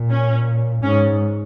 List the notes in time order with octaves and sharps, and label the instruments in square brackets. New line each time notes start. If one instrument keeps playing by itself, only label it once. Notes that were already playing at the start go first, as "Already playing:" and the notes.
Already playing: [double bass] A#2
[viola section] C#4
[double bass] G#2 [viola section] C#4